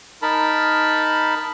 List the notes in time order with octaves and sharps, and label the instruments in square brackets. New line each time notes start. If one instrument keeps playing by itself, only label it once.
[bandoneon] D#4 A#4 A5 B5